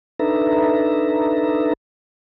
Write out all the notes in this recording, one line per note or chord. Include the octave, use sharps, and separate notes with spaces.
D4 D#4 A4 B4 E5 A#5